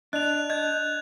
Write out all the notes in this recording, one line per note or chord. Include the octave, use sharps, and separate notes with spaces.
D4 D#5 F#6 F7
D#5 G6 G#6